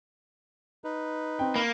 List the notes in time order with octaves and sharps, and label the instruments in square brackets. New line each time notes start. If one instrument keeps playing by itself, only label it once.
[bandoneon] D#4 B4
[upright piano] C4 G5
[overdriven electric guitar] A#3 [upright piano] B5